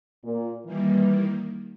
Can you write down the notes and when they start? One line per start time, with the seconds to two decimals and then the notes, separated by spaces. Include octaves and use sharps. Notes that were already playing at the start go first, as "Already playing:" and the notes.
0.25 A#2
0.66 D#3 E3 G3 A#3